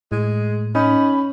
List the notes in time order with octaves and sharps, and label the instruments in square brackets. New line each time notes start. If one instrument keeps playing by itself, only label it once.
[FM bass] A2 [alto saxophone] G#3
[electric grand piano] C#4 [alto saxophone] D#4 [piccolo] B5